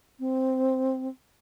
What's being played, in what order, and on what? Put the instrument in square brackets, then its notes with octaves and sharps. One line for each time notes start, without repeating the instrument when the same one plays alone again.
[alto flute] C4